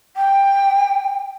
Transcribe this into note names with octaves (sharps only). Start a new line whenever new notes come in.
G5